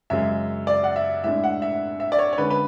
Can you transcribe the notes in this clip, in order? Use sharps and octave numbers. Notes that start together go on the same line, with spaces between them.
F#2 C#3 G#3 C#4 E5
D5
F#5
E5
A2 G#3 D4 E5
F#5
E5
E5
D5
C#5
C#5
D3 G#3 C#4 B4
B4